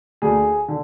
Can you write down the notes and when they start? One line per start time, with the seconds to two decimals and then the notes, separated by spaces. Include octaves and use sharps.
0.22 D2 G#4
0.68 D3